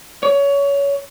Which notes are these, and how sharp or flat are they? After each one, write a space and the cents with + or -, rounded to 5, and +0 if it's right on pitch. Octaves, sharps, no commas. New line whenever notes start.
C#5 +20